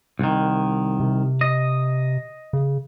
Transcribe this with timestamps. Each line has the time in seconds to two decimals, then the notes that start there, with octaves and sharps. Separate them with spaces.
0.19 C2 D#3
1.00 C3
1.41 D#5
2.53 C#3